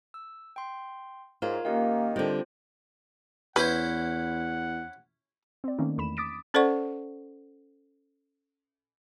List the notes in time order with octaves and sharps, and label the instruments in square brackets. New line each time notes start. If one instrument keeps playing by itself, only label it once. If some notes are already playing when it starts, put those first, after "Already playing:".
[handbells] E6
G5 C6
[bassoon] G#2 [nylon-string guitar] F4 [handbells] A#4 C#5
[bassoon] D#3 [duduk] A#3 [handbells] C#4 G4 F5
[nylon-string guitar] D3 G3 [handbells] C4 F4 C5
[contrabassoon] E2 [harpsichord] C#4 E4 C5 [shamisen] B4 [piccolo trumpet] F#5
[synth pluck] C4 D5
D#3 A3 A#3 C4 C#4 D#4
E2 A3 B5 E7
D6 D#6 A6 B6 D7
[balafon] C#4 A4 C5 D5 F#5 C#6